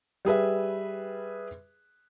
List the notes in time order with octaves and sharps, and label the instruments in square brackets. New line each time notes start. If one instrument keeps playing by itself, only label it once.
[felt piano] G3 G#4 B4 E5